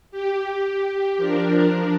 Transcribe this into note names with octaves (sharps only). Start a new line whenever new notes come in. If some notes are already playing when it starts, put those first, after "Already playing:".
G4
G4
F3 D4 A#4